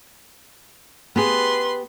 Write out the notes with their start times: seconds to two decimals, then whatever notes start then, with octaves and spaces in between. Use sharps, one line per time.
1.16 B3 G4 G#4 B4 C6